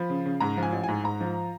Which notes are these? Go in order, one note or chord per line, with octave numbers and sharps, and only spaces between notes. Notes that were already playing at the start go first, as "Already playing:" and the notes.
Already playing: F3 B5
C#3
C#3
G#2 A#5
F3
G#5
A1
G#2 G#5
G#2 A#5
F3